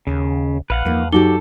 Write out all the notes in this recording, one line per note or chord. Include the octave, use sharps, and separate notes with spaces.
D#2 C#3
A#1 B4 F5 F#5
E2 F3 A#3 D#4
F#2 D#4 F#4 G4 A4 D6 G7